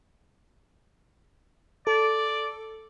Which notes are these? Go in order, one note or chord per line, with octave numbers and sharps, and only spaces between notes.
A4 D5